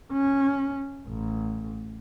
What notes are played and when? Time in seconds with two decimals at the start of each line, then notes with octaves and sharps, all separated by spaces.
0.13 C#4
1.08 A1